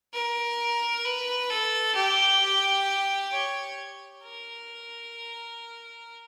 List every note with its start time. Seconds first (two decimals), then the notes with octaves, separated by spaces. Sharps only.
0.14 A#4
1.05 B4
1.50 A4
1.95 G4
3.32 C#5
4.24 A#4